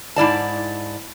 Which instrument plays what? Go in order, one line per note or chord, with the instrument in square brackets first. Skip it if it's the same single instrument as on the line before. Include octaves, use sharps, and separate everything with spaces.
[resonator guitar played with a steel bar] G#2 E4 D5 A5